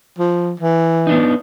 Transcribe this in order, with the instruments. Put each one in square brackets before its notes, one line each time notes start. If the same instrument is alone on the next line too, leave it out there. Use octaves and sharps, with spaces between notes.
[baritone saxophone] F3
E3
[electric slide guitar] B3 D4 D#4